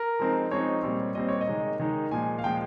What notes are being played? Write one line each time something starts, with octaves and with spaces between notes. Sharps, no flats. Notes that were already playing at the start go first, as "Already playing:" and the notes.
Already playing: A#4
F3 G#3 C4 D#4
F3 G#3 C4 D#4 C#5
A#2 G3 C4
A#2 G3 C4 D#5
C#5
D#5
D#3 G#3 D#4
D#3 G#3 D#4
A#2 F3 G#3 G#5
F5
A#2 F3 G#3 G5